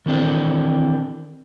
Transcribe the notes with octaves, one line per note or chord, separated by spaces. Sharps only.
D#3 E3 C4 D4 A4